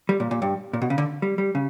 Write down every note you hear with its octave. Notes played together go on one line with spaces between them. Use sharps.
G3
A#2
A#2
G2
A#2
B2
C#3
D3
G3
G3
C#3